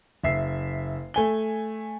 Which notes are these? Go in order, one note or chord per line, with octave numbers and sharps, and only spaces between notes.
F#1 E5 C7
A3 G#5 G7